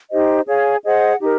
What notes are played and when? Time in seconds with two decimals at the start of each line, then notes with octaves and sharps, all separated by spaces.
0.11 D#4 G4 C5 D#5
0.47 G#4 C#5 F5 G#5
0.84 G#4 C5 D#5 F#5
1.20 D#4 G4 A#4